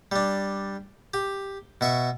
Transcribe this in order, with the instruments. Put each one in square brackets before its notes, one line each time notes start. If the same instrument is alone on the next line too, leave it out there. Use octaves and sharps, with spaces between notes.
[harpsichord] G3 D4
G4
B2 E5 C#6